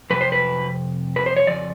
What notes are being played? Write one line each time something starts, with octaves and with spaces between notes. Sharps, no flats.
F2 C3 B4
C5
B4
B4
C5
C#5
F2 C#3 D5